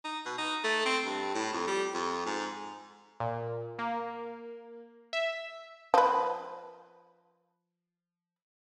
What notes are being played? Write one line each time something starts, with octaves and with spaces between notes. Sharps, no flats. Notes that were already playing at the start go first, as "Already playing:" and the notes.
D#4
B2
D#4
A3
C4
G2
A2
F2
G3
F2
G#2
A#2
A#3
E5
F3 B4